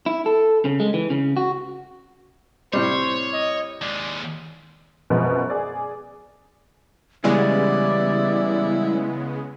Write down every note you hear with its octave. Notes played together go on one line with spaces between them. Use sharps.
E4
A4
C#3
G#3
E3
C#3
F#4
A2 C3 G3 C5 C#5
D#5
D#2 G#3 D5
F#2 B2 F3 G#3 B3
G#4 D5
C#3 E3 G3 G#3 B3 E4 D5